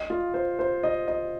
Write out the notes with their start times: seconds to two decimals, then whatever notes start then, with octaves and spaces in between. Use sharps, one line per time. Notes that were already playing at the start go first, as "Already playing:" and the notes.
Already playing: D#5
0.10 F4
0.34 C5
0.59 C5
0.83 D#5
1.08 D#5